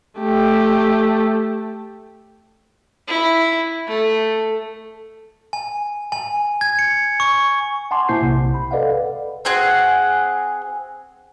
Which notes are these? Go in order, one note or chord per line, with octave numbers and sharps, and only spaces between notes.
A3 G4
E4
A3
G#5
G#5
G#6
C#7
C#6
F#5 G#5 A5 C6 D6
A#2 A#3 E4 C5 G6 C7
B1 C3
B5
A4 B4 D5 D#5 F5 F#5
C4 F#4 G#4 F#5